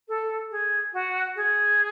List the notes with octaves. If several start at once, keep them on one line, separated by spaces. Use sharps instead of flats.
A4
G#4
F#4
G#4